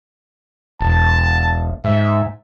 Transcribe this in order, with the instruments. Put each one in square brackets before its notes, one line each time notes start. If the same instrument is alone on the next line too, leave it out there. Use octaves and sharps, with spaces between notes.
[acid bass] E1 [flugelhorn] A5
[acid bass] G#2 [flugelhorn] E5